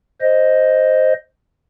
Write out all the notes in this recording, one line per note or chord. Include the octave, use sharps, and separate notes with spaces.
C5 D#5